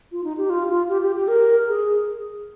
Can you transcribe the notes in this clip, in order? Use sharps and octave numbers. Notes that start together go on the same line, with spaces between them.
F4
D#4
G4
F4
F4
G4
G4
G4
A#4
G#4